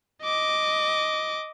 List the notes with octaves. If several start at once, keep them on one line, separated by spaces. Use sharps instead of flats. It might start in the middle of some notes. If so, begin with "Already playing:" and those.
D#5 D6